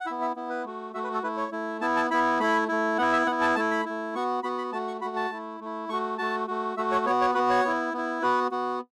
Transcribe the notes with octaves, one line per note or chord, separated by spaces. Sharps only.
F#5
E4 E5
B3
E5
B3 E4
B4
A3 F#4
A3 F#4 E5
B4
A4
A3 E4 B4
C#5
A3 E4
B3 E4 A5
A5
B3 E4 B5
A3 E4 B5
A3 E4
B3 E4 F#5
E5
B3 E4 F#5
A5
A3 E4 A5
B5
A3 E4
B3 F#4 C#6
B3 F#4 B5
B5
A3 F#4 A5
C#6
A3 F#4 B5
A5
A3 E4
A3 E4
A3 F#4 C#6
A3 F#4 A5
A3 F#4
A3 F#4 E5
C#5
B3 F#4 C#5
C#5
B3 F#4 B4
C#5
B3 E4
B3 E4
B3 F#4 B4
B3 F#4